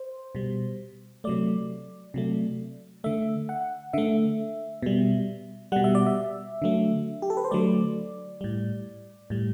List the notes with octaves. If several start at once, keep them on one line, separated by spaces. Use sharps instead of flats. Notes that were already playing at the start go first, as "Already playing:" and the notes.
Already playing: C5
B2 G3
C3 F#3 A3 D5
C3 F#3 A3
D3 A3 E5
F#5
D3 A3 E5
B2 G3
B2 G3 F#5
E5
D5
E5
D3 F#3 A3
G4
A4
B4
C5
D3 F#3 A3 D5
A2 G3
A2 G3